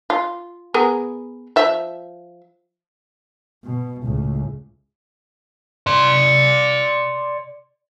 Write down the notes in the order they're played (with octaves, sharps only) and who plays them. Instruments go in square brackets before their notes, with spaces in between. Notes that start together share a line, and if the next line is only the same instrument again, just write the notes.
[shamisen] F4
B3 G#4 A#4
F3 E5
[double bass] B2
C#2 A2
[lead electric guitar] D5 C6